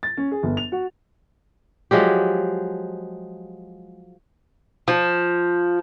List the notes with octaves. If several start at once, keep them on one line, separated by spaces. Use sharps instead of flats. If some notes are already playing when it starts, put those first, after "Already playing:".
A6
C#4
G#4
G1
F7
F#4
F3 F#3 G#3 G4
F3